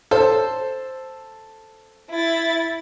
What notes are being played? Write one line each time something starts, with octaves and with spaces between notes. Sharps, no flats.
A4 C5
E4 A6